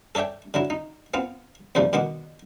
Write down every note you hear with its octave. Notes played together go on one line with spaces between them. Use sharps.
A4 C#5 D5 E5 G5
D3 F#3 E4
D#4
B3 C4 F4
E2 G2 C3 F3 G3 A3
B2 D#3 B3 F#4 D6